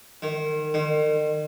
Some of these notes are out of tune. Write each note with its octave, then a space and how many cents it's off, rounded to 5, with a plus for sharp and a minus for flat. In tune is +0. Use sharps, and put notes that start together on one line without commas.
D#3 -30
D#3 -40